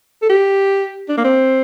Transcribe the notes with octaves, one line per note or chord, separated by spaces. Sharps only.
A4
G4
D4
A#3
C4